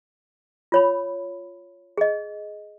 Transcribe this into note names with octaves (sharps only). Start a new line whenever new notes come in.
F4 C#5 B5
G#4 D#5